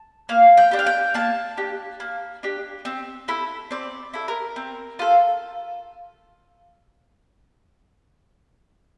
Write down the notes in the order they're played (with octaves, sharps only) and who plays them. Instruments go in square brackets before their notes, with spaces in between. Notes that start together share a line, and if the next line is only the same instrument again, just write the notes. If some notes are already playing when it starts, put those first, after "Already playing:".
Already playing: [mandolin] A5
A#3 F5
G5
D4 G4
F5
G5
A#3 A5
D4 G4
A#3
D4 G4
C4
E4 A4
C4 D5
E4 A4
A#4
C4
F4 A4